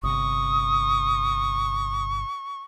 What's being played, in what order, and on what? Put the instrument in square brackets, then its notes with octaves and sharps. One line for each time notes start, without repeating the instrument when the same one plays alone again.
[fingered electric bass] G1 C3 [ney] C#6 [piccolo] D#6